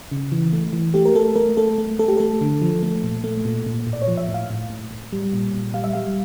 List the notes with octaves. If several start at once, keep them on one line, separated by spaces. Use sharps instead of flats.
C#3
E3
A3
E3
A3 G4
A#4
A3 A4
A3 A#4
A3 A4
A3
A3 A4
G4
A3 A4
D3
F3
A3
A#2
A3
A#2
A#2
A2
D5
C#5
F3
E5
A2
F5
A2
A2
A2
G3
A#2
A#2
G3 F5
E5
G3 F5